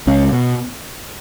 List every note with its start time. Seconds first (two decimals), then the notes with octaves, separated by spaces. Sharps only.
0.07 C#2 C#4
0.32 B2